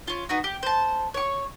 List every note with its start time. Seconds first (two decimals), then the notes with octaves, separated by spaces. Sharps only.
0.08 C#4 F4
0.29 B3 D#4 F#4
0.44 G4
0.63 C5 A5
1.14 C#5 C#6